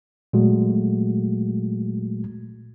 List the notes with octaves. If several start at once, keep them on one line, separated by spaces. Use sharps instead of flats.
A#2 F#3 G#3 A3 F#4